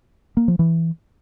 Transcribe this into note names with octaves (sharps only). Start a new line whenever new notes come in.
A#3
F3
E3